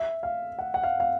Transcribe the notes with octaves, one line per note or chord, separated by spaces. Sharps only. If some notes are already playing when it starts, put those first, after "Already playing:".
Already playing: E5
F5
F#5
F#5
F5
F5